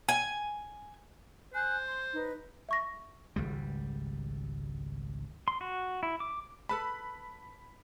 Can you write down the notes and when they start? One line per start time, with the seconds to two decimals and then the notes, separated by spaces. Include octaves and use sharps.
0.09 G#5
1.54 C5 G#5 F#6
1.86 C6
2.14 D#4 B4
2.69 E5 C#6 A#6
3.36 G#1 C#2 G3
5.48 C6
5.61 F#4
6.03 E4
6.20 D6
6.69 A4 B4 A5 B5